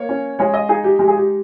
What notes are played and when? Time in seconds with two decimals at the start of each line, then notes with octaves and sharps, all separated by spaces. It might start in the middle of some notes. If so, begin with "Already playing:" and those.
Already playing: A#3 C#5
0.09 C#4
0.39 G#3 C#5
0.54 D#5
0.69 D#4 G#4
0.84 G4
0.99 G#3 G4
1.08 G#4
1.17 G4